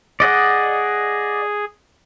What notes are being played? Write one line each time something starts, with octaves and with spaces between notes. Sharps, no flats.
G#4 D5 D#5 F#5